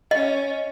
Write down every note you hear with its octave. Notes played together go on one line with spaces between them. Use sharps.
C#4 D#5